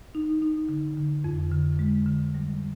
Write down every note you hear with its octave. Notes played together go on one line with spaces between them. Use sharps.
D#4
D#4
D3
D3
F2
D3
G#3
D3
G3